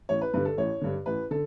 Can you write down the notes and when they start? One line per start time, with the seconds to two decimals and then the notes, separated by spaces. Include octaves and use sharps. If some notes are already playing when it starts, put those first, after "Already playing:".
0.09 A1 C#5
0.21 B4
0.34 G2 D3 B4
0.45 A4
0.58 A1 C#5
0.81 G2 D3
1.06 A1 B4
1.31 D3 A4